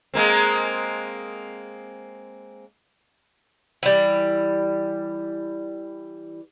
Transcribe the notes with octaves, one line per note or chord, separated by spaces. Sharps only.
G#3 A#3 C4
E3 G3